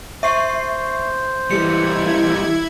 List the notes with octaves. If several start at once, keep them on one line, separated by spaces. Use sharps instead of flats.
C5 E5 C#6 C7
E3 G3 E4 G#6 C#7